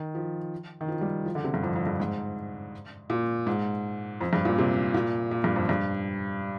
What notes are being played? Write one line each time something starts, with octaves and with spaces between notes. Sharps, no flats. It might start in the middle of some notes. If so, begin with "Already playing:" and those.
Already playing: D#3
F3
D#3
F3
G3
F3
D3
C3
G2
F2
F2
G2
G#2
A#2
G#2
F2
G2
A#2
C3
A#2
A#2
G2
F2
G2